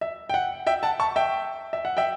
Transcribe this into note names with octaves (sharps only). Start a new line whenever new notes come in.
E5
G5
F#5
E5 G5
F#5 A5
A5 C#6
E5 G5
E5
F#5
E5 G5